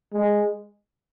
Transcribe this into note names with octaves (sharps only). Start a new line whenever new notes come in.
G#3